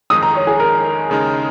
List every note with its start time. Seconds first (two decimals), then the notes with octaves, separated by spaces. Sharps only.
0.10 F2 D#3 G#3 D#4 D#6
0.23 A#5
0.35 C#5
0.47 G#4
0.60 A#4
1.10 D#2 C#3 G#3 D#4 G#4